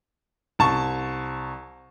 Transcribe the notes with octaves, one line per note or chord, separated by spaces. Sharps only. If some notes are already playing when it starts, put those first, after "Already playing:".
C2 A5 C#6